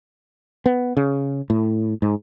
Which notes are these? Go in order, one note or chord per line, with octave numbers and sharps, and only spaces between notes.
B3
C#3
A2
G#2